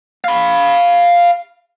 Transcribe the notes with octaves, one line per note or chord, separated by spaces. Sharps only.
F5 B5